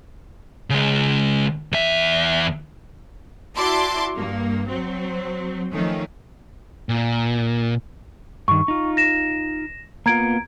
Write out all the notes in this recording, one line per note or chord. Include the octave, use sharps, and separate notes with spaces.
C#3 G#3
E2 E5
E4 F#4 D5 A5 C6 D6
G2 A#3
F#3 C4
D#3 F3 A3 C#4
A#2
G2 D#3 C#6
D#4 F4
A#6 E7
A#3 B3 F4 A#5 G#6 D7